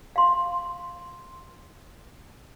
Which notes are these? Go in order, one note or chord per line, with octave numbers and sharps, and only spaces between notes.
F5 C6